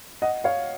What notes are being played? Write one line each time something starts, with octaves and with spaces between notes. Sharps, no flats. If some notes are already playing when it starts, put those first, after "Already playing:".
D#5 F#5
C#5 F5